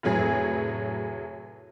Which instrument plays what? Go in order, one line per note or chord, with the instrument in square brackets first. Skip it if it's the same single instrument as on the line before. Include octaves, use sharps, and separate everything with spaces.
[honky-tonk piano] F1 A2 F#3 G#4 B4